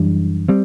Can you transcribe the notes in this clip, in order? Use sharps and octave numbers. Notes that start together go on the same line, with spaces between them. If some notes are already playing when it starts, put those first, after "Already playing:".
Already playing: F#2 E3 G3 D4
G3 C4